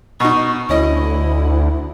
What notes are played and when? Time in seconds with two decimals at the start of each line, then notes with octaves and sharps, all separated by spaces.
0.20 B2 D#4 C#6
0.69 D2 C#4 E4 D#5